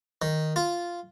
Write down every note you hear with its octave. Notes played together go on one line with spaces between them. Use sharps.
D#3
F4